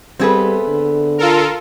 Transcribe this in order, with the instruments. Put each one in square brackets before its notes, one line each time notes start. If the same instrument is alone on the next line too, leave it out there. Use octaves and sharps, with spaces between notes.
[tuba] G3 [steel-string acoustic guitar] B3 A4 E5 [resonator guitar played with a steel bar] C4 G#4 B4
[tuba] D3
[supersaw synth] F4 A4 A#4